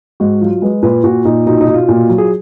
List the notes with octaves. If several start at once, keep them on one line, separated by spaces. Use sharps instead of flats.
G#2 F#4
F#3 F4
G#3 B4
A#2 B4
A#2 F#4
A#2 D#4
B2 D#4
D#4
B2
F4
A#2
F#3
G#4